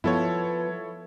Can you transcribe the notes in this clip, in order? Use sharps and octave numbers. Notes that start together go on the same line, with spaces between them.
F3 B3 E4 A4 C#5